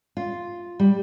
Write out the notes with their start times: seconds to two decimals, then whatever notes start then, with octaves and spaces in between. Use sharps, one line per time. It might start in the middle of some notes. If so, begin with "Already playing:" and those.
0.17 F4
0.80 G3